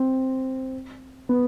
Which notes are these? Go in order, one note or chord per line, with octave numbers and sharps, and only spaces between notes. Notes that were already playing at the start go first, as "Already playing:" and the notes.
Already playing: C4
B3